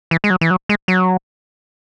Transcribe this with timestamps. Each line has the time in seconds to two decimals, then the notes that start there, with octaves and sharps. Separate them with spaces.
0.11 E3
0.24 G#3
0.30 F#3
0.41 E3
0.51 F#3
0.69 G#3
0.88 F#3